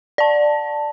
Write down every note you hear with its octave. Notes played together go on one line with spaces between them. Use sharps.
D5 A5